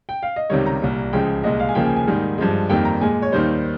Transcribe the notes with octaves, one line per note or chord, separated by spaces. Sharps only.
G5
F5
D#5
C#2 C3 D#3 G3 C#5
A#5
C2 A#2 G3
C#2 C#3 F3 G#3 G5
C2 A#2 G#3 D#5
F5
G#5
D#2 C#3 F3 A#3 G5
G#5
G#5
G#2 D#3 G3 A#3
G2 F3 G#3
F2 D#3 G3 A#3 G5
A#5
A#2 G#3 G#5
C#5
D#2 D#3 G3 C5